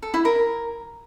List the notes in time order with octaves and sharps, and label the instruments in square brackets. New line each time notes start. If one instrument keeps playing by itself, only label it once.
[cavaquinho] A4
E4
A#4